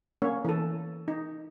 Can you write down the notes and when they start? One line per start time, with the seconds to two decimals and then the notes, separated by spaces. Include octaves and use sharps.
0.22 A#3 C#4 C#5
0.45 E3 A4
1.08 D#4